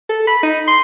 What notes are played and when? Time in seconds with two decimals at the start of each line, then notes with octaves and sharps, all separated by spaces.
0.10 A4
0.27 B5
0.43 D#4
0.68 C6